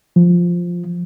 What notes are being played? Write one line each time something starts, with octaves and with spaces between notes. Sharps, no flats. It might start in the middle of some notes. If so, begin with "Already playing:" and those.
F3